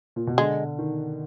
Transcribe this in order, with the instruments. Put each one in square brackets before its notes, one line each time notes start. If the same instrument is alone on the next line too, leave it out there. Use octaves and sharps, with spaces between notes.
[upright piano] A#2
B2
[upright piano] D3 [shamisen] G#3
[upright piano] D#3